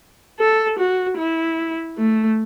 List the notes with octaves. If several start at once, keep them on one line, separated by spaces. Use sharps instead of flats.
A4
F#4
E4
A3